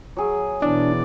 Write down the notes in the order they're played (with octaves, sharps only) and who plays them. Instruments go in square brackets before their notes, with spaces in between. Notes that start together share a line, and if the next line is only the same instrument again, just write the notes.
[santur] F#3 G#4
[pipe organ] B2 E3 D5 [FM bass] D4